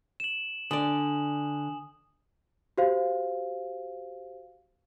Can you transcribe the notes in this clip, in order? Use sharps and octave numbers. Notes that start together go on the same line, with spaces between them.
E7 F#7
D3 D5 G#5 D#6 F#7
F#4 G4 C5 F5